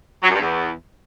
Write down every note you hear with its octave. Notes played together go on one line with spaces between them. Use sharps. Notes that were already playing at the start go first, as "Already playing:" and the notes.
F#3
F#2
G2
E2